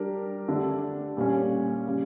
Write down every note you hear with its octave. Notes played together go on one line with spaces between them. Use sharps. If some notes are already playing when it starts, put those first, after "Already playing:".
Already playing: G3 D4 G4 A#4
D3 A3 D4 G4
A#2 G3 C#4
C#3 G3